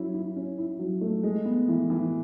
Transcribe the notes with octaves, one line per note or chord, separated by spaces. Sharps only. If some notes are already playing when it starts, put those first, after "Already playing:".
Already playing: F#3 C#4 E4
E4
C#4
E4
F#3
A3
G#3
B3
E3
E3